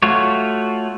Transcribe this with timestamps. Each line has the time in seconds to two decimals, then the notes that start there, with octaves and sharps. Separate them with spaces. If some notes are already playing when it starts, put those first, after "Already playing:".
0.02 A3 F4 F#4 C#5